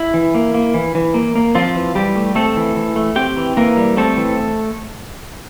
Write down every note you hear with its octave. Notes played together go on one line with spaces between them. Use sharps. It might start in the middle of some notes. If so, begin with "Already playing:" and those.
Already playing: E4
E3
A#3
A#3
E3
E3
A#3
A#3
F3 C4 F4
E3
E3 G3 G4
A3
A3 C4 A4
E3
E3
A3
C4 G4 G5
E3
E3 A#3 A#4
G3
A3 C4 A4
E3